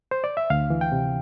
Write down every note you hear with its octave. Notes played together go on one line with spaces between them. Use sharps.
C5
D5
E5
D2 F5
E3
G5
C3